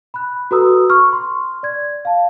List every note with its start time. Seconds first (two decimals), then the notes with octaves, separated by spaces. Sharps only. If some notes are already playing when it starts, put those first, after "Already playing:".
0.14 B5 F#6
0.51 F#4 A4 B4 A#5 D#6 E6
0.90 B5 C#6 F6
1.13 C6
1.63 D5 G#6
2.05 F5 A5